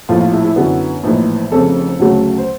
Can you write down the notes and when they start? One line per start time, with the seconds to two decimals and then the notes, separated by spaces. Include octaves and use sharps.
0.09 A#1 A2 F3 A3 F4
0.20 F4
0.33 E4
0.44 E4
0.56 F#2 D3 F#3 B3
1.04 A#1 A2 E3 D#4
1.51 F1 F2 C#3 A4
1.99 D2 C#3 F#3 A3
2.38 C5